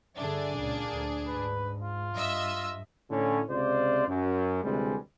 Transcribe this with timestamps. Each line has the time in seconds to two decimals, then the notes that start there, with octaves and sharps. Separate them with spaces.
0.16 G2 D3 D4 G#4 E5
0.58 C#2 A#2 A#3
0.91 D2
1.27 G#2 B4
1.82 F4
2.15 G2 D#5 E5 E6
3.10 A2 D3 C#4
3.50 C#2 C3 F4 C5 D5
4.08 F#2
4.63 D2 C3 E3 G3 G#3